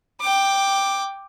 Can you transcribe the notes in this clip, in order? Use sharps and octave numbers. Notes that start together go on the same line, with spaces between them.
G5 D6